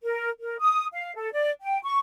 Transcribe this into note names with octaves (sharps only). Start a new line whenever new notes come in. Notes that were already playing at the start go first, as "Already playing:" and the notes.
A#4
A#4
D#6
F5
A4
D5
G5
C#6